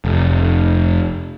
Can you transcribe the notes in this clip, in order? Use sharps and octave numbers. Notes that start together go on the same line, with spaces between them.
F1